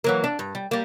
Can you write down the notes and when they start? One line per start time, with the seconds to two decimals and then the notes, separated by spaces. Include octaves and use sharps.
0.04 E3 F#3 A#3
0.24 D4
0.39 G2
0.55 G3
0.71 G3 A#3